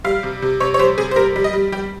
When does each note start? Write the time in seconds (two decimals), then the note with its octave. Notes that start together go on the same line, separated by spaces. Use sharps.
0.04 G3 F5
0.23 C3
0.42 C3
0.60 C3 C#5
0.74 C#5
0.79 G3 C5
0.98 C3 G#4
1.11 C5
1.16 G3 A#4
1.36 G3
1.44 D#5
1.53 G3
1.72 G3 G4